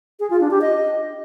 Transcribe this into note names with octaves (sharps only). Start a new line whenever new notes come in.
G#4
F4
D4
G4
D#5